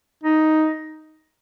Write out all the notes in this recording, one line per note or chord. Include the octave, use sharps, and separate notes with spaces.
D#4